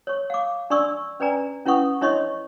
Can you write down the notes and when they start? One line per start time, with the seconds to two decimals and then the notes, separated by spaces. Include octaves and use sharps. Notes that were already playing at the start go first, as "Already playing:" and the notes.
0.07 C#5 C#6
0.30 F5 D6
0.70 D4 D5 C6 C#6 E6
1.20 C#4 B4 D5 G#5 A#5
1.66 C#4 E4 B4 F#5 C#6 D#6
2.01 D4 E4 C#5 D#5 C6 C#6